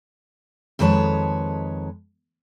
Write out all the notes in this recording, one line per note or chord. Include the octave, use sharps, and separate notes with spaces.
F2 D#3 G#3 B4 C#5 A5